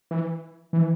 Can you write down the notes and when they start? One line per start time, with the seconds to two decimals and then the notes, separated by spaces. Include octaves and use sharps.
0.11 E3
0.73 E3